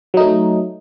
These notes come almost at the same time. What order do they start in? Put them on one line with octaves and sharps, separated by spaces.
F#3 D#4 A3